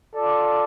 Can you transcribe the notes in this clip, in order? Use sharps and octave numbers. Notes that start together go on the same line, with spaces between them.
F4 A4 D5